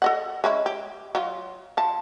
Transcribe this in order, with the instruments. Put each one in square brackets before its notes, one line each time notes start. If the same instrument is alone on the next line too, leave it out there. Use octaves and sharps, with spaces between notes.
[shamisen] A4 D#5 F#5
G#3 C#4 E4
G4
F#3 F4
F3 A5